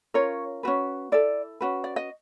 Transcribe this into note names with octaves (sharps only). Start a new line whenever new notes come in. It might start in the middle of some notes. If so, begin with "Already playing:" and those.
C#4 F4 A#4 C#5
C#4 F#4 B4
E4 A4 D5
C#4 F#4 B4
D5
D#5